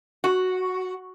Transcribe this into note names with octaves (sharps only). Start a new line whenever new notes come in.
F#4